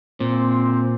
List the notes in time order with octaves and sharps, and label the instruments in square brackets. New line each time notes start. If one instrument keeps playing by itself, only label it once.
[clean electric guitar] A#2 [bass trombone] C4